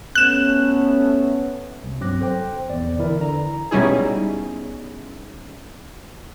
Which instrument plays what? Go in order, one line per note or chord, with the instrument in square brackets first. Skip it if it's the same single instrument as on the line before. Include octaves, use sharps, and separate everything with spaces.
[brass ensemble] A3 B3 C#4 [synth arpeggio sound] F#6 E7
[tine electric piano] C2
G2 F#3 C4 D6 F#6 A#6
A4 C5 G5
A#1 E2 D5
A1 D3 E3 E4 A#4 D5
D3 A#5
[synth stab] B2 G3 C#4 D#4 E4 G#4